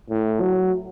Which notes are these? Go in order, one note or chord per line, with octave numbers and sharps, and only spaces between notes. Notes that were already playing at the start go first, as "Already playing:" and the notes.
A2
F#3